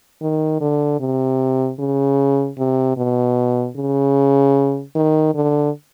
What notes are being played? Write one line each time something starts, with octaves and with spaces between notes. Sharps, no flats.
D#3
D3
C3
C#3
C3
B2
C#3
D#3
D3